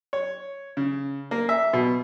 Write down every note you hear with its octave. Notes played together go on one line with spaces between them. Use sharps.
C#5
C#3
A#3
E5
B2